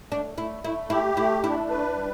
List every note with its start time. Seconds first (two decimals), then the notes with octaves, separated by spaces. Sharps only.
0.11 A3 D4
0.38 A3 E4
0.64 A3 E4
0.90 E4 G4
1.17 A3 E4
1.44 D4 E4
1.70 B4
1.96 G3